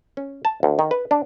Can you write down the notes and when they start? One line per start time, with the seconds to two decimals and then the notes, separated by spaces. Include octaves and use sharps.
0.17 C#4
0.45 A5
0.63 D2
0.79 D#3
0.91 B4
1.11 D4